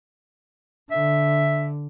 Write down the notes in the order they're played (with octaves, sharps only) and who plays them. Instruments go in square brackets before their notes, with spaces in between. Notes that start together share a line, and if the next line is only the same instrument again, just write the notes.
[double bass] D3 [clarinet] E5